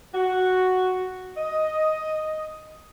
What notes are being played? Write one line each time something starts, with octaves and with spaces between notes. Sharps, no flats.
F#4
D#5